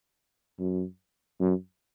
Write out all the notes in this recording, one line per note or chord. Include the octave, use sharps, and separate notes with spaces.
F#2
F#2